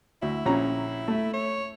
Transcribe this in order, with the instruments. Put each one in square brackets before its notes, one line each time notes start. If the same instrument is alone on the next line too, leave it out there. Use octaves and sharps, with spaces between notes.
[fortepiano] D2 [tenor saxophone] E4
[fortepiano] A#1 C#4 A#5
A3
[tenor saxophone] C#5